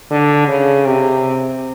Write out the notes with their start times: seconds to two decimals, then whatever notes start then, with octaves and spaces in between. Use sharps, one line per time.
0.11 D3
0.48 C#3
0.86 C3